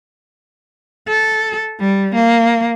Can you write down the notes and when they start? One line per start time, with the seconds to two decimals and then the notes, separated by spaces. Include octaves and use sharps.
1.08 A4
1.79 G3
2.14 A#3